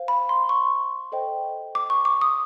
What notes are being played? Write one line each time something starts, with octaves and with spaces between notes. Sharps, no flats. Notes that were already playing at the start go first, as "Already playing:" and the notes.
Already playing: C5 F5
B5
C6
C#6
A4 C5 D#5 G5
D6
C#6
D6
D#6